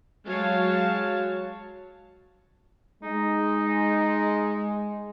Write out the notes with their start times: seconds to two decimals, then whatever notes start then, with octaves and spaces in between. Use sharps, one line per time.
0.25 F#3 G#3 C#5 F5 A5
3.03 G#3 D#4